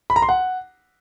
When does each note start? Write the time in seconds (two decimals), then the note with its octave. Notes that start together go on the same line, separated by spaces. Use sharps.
0.10 B5
0.16 A#5
0.22 C6
0.29 F#5